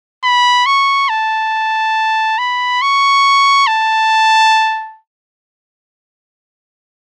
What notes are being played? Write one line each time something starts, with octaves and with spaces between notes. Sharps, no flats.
B5
C#6
A5
B5
C#6
A5